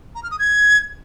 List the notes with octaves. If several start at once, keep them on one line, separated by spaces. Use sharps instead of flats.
A#5
F6
D#6
G#6